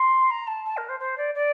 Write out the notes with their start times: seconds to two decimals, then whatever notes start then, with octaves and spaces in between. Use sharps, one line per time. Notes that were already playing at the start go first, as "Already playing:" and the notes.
Already playing: C6
0.30 A#5
0.47 A5
0.65 A5
0.77 A#4
0.89 C5
0.99 C5
1.17 D5
1.34 D5